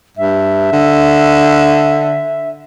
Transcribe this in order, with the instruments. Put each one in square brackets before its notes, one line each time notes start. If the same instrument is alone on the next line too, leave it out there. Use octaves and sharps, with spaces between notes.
[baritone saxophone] G2 [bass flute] E5
[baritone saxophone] D3